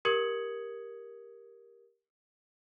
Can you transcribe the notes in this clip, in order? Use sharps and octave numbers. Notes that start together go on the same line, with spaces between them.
G4 A#4 D#6 G#6 C#7 F#7